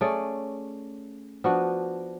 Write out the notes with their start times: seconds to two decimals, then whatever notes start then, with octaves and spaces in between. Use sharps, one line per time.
0.01 A3 C#4 G#4 D5
1.44 F3 B3 D4 F#4